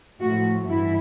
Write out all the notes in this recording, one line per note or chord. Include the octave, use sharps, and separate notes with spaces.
A2 F3 A3 F#4
G2 E3 E4